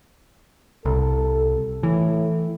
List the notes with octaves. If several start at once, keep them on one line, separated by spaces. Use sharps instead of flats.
C2 A4
A2 E3